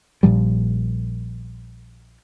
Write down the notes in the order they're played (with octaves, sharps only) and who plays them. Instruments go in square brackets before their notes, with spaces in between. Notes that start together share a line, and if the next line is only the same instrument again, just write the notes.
[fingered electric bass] A#1 A#2 F3 G3